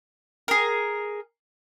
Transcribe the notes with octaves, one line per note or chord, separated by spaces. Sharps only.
G#4 A#4